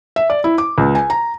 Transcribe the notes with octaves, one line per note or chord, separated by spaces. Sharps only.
E5
D5
E4
D6
C#2
G#5
A#5